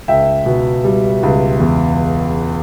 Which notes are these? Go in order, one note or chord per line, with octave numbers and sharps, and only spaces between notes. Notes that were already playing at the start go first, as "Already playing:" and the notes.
C#2 E5 G5
B2
G3
C#2
E2